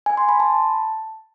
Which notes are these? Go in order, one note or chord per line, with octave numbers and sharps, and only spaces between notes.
G#5
C6
B5
A5